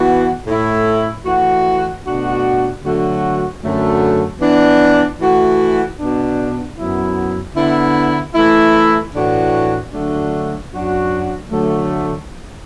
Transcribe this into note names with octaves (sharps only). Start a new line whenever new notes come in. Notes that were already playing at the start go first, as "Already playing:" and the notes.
Already playing: E3 B3 F#4
A2 A3 E4
E3 A3 F#4
B2 A3 D4 F#4
D3 F#3 A3 F#4
F#2 D3 F#3 A3
E3 B3 D4
E3 A3 F#4
B2 B3 D4
F#2 F#3 B3 E4
D3 B3 E4
E3 A3 E4
A2 E3 D4 F#4
D3 F#3 A3 D4 F#4
F#2 F#3 D4 F#4
D3 F#3 A3